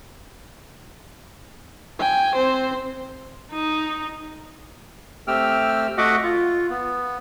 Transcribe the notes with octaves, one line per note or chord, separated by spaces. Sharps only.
G5 G#5
C4 C5
D#4
A3 C4 G4 G5 E6 F6
A3 F#4 D#5 E5 F#5 D6
F4
B3